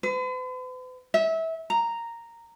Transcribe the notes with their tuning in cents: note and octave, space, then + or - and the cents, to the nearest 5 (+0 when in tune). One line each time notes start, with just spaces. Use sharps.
B4 +45
E5 -25
A#5 -5